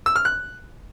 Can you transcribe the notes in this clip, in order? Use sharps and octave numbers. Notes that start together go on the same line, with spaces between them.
E6
F6
F#6